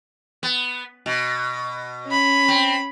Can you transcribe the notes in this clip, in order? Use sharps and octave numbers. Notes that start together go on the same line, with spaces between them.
B3
B2
C#4 B5
C4